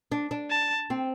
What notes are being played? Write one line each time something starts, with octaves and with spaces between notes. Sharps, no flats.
D4
D4
A5
C4